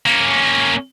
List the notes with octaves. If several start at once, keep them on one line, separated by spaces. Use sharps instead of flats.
A#3 C#4